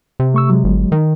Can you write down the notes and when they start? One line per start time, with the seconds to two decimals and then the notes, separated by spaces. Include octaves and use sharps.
0.20 C3
0.34 A3 C#6 E6
0.50 F#3 G#3
0.64 G1
0.92 D#3